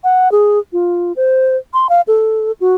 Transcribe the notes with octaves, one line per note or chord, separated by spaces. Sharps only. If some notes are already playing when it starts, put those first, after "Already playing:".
F#5
G#4
F4
C5
C6
F5
A4
F#4